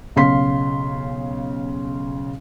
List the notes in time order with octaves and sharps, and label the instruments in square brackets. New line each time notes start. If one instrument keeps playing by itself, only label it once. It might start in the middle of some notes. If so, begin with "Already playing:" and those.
[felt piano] B1 C#3 F5 C6 B6